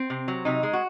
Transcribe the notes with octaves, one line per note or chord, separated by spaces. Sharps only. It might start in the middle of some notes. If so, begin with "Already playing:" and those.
Already playing: C4
C3
F#3
C3 D#4
G#3
F#4